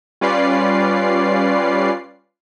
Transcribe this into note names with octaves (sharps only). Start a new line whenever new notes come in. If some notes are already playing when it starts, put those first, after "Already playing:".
G3 C#4 F4 B4 D5 C7